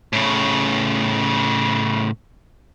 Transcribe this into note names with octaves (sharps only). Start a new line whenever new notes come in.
A2 C#3